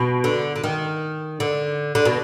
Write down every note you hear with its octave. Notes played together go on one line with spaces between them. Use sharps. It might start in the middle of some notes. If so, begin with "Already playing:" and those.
Already playing: B2
D3
D3
D#3
D3
D3
B2